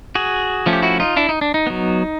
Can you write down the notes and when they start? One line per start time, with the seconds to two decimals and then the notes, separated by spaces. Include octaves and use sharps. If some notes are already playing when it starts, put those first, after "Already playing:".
0.15 F#4 G#4
0.66 F3 A3 C#4
0.73 G4
0.82 E4 F#4
1.00 D#4 F4
1.16 D4 E4
1.29 D#4
1.41 D4
1.54 D#4
1.67 F#3 B3